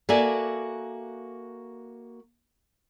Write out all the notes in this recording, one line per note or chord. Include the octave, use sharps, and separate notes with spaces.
A#3 F#4 A4 D5 E5 G#5